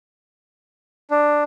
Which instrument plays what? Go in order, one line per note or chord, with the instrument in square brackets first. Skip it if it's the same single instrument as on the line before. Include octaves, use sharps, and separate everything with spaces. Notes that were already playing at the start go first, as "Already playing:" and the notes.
[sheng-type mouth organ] D4